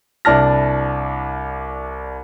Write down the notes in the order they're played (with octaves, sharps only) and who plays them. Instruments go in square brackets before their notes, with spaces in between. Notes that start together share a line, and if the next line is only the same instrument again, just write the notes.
[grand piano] C2 D4 E4 A5 F6 A#6